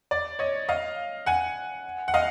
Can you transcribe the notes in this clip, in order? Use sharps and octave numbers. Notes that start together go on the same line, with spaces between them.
D5
C#5 D#5
D#5 F5
F#5 G#5
F#5
D#5 F5